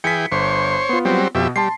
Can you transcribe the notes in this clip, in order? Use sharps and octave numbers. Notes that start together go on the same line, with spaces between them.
E3 G#4 G5 B6 C#7
G1 C5 C#5
B3 F4
F#3 G3 C4
F2 B2 B3 G4 E5
G3 A5 C6 C7